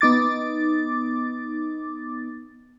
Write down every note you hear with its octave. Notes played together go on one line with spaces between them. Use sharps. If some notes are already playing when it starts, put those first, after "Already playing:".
B3 D#4 D6 A6